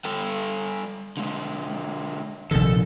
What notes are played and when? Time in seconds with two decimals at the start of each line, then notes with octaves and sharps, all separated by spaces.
0.05 G3 A4 G5
1.17 D3 G#3
2.51 A#1 C3 D#3 A4